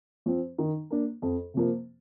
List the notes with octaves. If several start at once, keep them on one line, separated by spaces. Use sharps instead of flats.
F3 C4
D#3
A#3 D4
F2
C3 F3 A#3